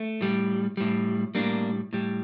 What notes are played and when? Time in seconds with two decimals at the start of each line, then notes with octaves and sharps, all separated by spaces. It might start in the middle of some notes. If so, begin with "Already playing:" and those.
Already playing: A3
0.21 A2 G3
0.77 A2 G3
1.35 A2 G3 A#3 D4
1.93 A2 G3